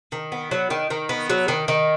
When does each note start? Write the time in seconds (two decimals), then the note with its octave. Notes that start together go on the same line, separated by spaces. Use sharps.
0.12 D#3
0.32 B3
0.51 F#3
0.70 D#3
0.90 D#3
1.09 B3
1.30 F#3
1.48 D#3
1.68 D#3